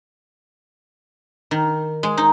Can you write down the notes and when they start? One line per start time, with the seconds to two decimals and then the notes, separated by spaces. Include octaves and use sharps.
1.51 D#3
2.03 G#3
2.17 D#4